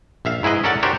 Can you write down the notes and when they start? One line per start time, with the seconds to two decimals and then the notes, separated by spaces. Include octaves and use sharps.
0.25 A#1 E5 F5
0.43 G#2 E4 G#4 B4 D#5
0.64 C#4 A4 A#4 D5 F#5 A5
0.83 D4 F#4 G4 A#4 C5 C#5